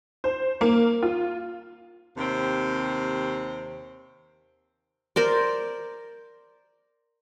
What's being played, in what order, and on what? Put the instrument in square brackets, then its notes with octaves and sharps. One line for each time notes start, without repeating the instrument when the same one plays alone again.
[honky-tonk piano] C5
A#3
F4
[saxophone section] D#2 C3 C4
[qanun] A#4 C5 D5